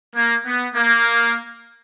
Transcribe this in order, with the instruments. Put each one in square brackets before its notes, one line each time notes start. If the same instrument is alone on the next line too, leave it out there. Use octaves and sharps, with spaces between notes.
[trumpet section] A#3
B3
A#3